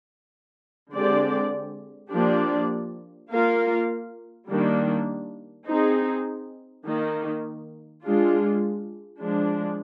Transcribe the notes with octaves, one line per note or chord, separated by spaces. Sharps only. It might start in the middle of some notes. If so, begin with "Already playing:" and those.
D3 G#3 C4 G4 D5
F3 A#3 D4 G4 D5
A#3 F4 A#4 F5
D#3 G3 A#3 D4
C4 D#4 G#4
D#3 A#3 D#4
G#3 D4 F4
F3 G#3 D4